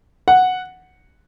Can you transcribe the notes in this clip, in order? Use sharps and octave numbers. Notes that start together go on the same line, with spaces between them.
F#5